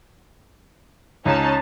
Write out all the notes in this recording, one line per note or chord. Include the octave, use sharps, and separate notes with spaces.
C#2 C#4 D#4 A5